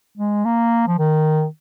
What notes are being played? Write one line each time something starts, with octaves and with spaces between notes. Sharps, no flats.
G#3
A#3
F3
D#3